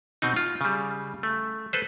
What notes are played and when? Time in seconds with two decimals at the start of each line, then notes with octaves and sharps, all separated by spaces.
0.22 B2 C4 D#4
0.36 F4
0.61 C#3 G3
1.23 A3
1.73 A4 B4 C5